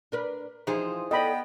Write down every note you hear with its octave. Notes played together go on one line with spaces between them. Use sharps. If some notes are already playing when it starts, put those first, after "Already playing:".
D4 A#4 B4
E3 F3 D#4 G4 G#4 C5
B3 A4 D5 D#5 G5 B5